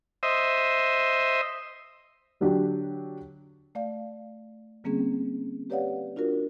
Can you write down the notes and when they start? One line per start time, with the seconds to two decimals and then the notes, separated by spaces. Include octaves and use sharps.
0.23 C5 D#5 E5
2.41 D3 F#3 D4 G4
3.75 A3 D5 F5
4.84 D3 G3 A#3 C4 C#4 G#4
5.70 G4 B4 C#5 D5 F5 F#5
6.16 D4 F4 F#4 A#4